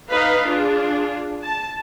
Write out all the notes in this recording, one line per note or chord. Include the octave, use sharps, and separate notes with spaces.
D#4 B4 D#5 F5
D4 F4 G#4
A5